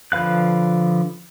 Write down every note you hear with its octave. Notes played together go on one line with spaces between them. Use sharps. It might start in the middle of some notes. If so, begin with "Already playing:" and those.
D3 F3 B4 F5 F#6